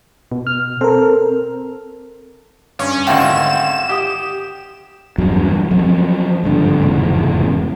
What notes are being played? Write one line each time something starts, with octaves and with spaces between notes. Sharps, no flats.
B2
F6
C4 A4 A#4
G2 C#4
G#1 D2 F4 F#4 G5 E7
G4 D#6
E2 G2 B2 F#3
F3 F#3 C4
G#1 G2 D3
F1 E2 G#2 C#3